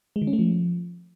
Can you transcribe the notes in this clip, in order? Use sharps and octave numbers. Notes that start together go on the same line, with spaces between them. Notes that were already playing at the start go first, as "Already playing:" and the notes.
G#3
D#3
C#4
A3
F3